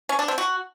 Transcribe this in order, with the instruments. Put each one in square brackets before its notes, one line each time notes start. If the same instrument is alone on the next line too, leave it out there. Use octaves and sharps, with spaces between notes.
[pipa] C#4
D4
C4
F#4